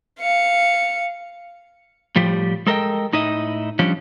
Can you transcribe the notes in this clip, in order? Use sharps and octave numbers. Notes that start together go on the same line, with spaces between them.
F5 C#7
A2 F3 G3 G4
G#3 A4 A#4 C#5 D#5 G5
A2 D#4 E4 D#5
F3 G3 C#4 D4